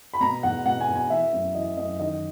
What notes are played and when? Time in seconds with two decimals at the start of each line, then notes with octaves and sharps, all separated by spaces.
0.14 B5
0.21 B2 A#5
0.43 E2 F#5
0.65 B2 F#5
0.81 G#5
0.88 E2
0.96 G#5
1.10 E3 E5
1.32 F#2
1.55 E3 D#5
1.77 F#2 D#5
1.99 D#3 D#5